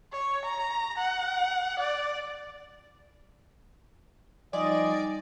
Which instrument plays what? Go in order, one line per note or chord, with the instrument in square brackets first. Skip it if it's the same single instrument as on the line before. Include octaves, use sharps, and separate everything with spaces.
[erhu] C#5
A#5
F#5
D5
[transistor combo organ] F3 G#5 D6 [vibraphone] G3 D#4 [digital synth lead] D5 [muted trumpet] D#5